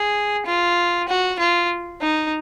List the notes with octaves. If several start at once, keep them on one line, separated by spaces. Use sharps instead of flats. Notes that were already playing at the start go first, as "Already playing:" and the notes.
Already playing: G#4
F4
F#4
F4
D#4